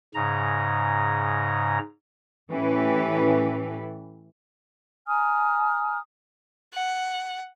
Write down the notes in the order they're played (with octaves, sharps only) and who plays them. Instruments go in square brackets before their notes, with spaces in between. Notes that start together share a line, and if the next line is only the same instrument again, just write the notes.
[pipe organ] G#2 C#3 A#5
[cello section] A2 E3 C#4 G4 A4 B4
[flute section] G#5 A#5 D#6 F6
[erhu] F#5